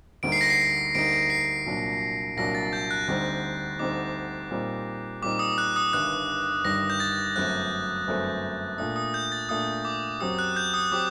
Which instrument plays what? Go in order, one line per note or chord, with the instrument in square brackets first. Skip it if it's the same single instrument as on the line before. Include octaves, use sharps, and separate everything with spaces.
[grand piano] D2 D3 G3 A#3 D#4 [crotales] D7
[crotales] C7
A#6
C7
[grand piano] D2 D3 G3 A#3 D#4 [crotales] D7
[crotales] C7
[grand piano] C2 A#2 F#3 A#3 D4
[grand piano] C2 A#2 F#3 A#3 D4 [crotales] A#6
[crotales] A6
G6
F#6
[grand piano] D2 D3 G3 C4 D#4 [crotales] F#6
[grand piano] D2 D3 G3 C4 D#4 [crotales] D6
[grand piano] A#2 G3 C4 D#4
[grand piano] A#2 G3 C4 D#4 [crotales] D6
[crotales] D#6
F#6
D#6
[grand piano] G1 G2 D#3 G3 [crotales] F#6
[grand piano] G1 G2 D#3 G3 [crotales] A#6
[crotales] G6
A6
[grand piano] G1 F#2 F#3 A3 C4 [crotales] F#6
[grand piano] G1 F#2 F#3 A3 C4
[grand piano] A#2 A3 D4 [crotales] D#6
[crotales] D#6
G6
A6
[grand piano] A#2 A3 D4 [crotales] D#6
[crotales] D6
[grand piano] F#2 F#3 C4 G4 [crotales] D#6
[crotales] F#6
G6
D#6
[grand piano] F#3 C4 G4 [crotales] D6